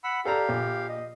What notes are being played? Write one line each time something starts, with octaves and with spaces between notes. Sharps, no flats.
F#5 B5 E6
G4 A4 D5 F5 A#5
A#1
D#5